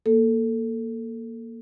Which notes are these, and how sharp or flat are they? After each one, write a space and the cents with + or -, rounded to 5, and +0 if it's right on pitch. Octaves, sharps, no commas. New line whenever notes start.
A#3 +0 A4 +10